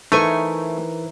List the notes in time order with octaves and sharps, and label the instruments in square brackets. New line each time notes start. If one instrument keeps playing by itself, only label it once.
[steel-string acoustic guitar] E3 [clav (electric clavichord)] A3 [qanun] D#4 G#5 C#6 [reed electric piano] A#4 C5